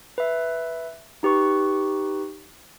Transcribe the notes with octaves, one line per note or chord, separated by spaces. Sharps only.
B4 E5
D#4 G4 B4 C#6